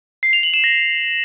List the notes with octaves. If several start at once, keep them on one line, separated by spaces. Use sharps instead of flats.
C7
F7
F#7
E7
A#6